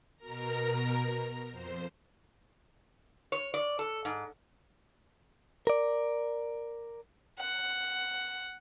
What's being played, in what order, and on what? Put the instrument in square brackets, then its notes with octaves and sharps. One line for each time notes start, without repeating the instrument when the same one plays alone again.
[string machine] B2 A#4 A#5
F2 C5
[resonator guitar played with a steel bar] C#5
D5
A4
G#2
[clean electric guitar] A#4 D5
[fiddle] F#5